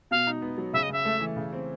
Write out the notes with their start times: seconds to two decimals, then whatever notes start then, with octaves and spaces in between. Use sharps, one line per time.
0.11 B2 F5
0.27 D#4
0.42 B3
0.58 F#3
0.73 C#3 E5
0.83 D#5
0.89 C#3 E5
1.05 A3
1.21 E3
1.36 C#3
1.53 C4